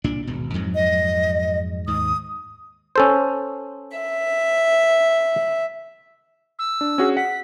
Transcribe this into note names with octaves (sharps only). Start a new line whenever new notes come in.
C2 A#2 D4
D#1 G#1 B2
F2 G#2 F#3
D#5
D#2 G#2 D#6
C#4 A4 C5
E5
E6
D4
C#4 F#4 G#4
F#5 B6